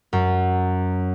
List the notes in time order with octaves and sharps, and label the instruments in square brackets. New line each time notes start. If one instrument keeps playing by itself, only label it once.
[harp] F#2